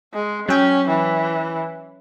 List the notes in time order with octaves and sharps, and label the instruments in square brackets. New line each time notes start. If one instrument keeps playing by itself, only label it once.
[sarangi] G#3
[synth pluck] F#3 G5 [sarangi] C#4
[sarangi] E3